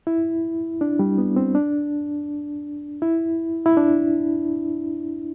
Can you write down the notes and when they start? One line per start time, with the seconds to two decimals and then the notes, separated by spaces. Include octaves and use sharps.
0.07 E4
0.81 D4
0.99 G3
1.18 B3
1.36 C4
1.55 D4
3.02 E4
3.66 E4
3.77 D4